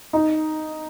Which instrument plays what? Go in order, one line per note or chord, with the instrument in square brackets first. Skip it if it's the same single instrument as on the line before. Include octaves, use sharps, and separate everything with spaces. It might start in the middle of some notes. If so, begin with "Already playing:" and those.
[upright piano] D#4